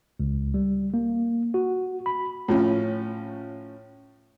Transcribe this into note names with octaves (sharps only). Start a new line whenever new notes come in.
C#2
G3
A#3
F#4
B5
A2 F3 C#4